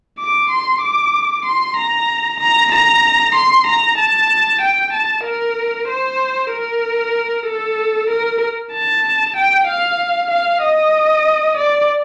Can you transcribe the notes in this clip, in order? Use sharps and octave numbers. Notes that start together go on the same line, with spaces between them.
D6
C6
D6
C6
A#5
A#5
A#5
C6
A#5
A5
G5
A5
A#4
C5
A#4
A4
A#4
A5
G5
F5
F5
D#5
D5